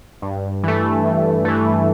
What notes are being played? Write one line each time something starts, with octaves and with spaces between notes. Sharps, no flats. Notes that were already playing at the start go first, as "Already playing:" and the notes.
G2
E3 A3
G2
E3 A3